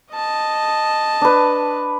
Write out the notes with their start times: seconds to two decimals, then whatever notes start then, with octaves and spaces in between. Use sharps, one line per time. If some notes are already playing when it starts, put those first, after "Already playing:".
0.14 D#5 A5
1.21 D4 B4